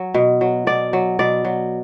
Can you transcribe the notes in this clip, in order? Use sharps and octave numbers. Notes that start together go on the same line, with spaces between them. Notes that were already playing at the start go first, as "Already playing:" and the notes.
Already playing: F#3
B2
F#3
B2 D5
F#3
B2 D5
F#3